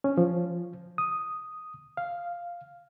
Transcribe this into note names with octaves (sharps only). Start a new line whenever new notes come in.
C#4
F3
D#6
F5